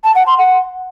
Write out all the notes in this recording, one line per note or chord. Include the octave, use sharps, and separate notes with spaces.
A5
F#5
C6
F#5